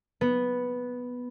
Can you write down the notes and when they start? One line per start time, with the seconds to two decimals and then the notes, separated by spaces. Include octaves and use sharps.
0.21 B3